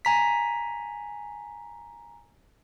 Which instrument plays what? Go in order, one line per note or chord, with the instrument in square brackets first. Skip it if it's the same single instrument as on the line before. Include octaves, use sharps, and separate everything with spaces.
[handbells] G#5 A#5 B6